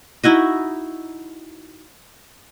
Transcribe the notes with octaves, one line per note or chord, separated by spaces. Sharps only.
D#4 E4 F#4 D#5